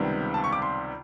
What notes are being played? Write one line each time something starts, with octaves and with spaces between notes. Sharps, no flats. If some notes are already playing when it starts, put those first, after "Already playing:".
Already playing: C#2 C3 D#3 G3 B3
A5
C#6
D6
C6